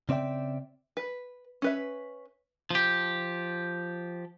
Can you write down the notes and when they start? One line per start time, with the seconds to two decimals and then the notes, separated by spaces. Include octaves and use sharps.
0.09 C#3 C4 D5 E5 G5
0.97 B4
1.62 C#4 B4 E5
2.71 F3 G4